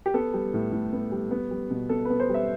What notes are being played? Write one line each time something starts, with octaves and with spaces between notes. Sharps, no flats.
G4
B3 A4
G3
A2
A2
B3
G3
B3
G3
B2
B2 A4
B4
B3
C5
G3 E5